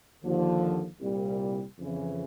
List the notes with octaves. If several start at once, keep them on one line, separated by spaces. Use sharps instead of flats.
D#2 D3 F3
C2 A#2 G3
F2 C#3 E3